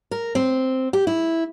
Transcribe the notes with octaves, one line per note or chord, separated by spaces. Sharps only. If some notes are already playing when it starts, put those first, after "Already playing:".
A#4
C4
G4
E4